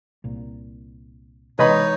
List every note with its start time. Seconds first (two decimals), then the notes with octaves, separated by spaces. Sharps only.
0.24 C2 A#2
1.59 C3 E3 G#3 D#4 B4 C#5 D#5 B5